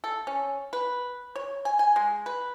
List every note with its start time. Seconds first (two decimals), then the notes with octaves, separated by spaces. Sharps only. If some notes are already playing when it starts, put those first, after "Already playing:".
0.04 A4
0.27 C#4
0.73 B4
1.36 C#5
1.65 G#5
1.79 G#5
1.96 G#3
2.26 B4